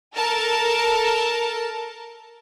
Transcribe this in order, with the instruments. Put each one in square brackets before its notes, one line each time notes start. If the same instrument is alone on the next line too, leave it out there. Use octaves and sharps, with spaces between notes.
[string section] A4 A#4 A5